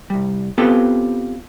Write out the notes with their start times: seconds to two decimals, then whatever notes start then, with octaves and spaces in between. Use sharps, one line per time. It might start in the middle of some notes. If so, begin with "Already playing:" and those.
0.10 C2 G3
0.58 B3 C4 F4 G4 A4 B4